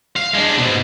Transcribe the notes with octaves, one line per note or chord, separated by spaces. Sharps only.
F5
G#3 D4
G#2 B2